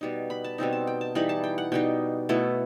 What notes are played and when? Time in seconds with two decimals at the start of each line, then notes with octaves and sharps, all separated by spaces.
0.01 B2 G3 D#4
0.30 B5
0.44 A5
0.58 B2 G3 C4 D#4
0.73 A5
0.87 G5
1.01 A5
1.15 E3 G3 D#4 B5
1.29 A5
1.44 G5
1.58 F#5
1.72 B2 G3 D#4 G5
2.29 B2 A3 E4